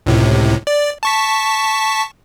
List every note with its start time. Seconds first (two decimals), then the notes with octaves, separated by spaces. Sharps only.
0.06 C#2 A2 C3
0.67 D5
1.03 A5 C#6 B6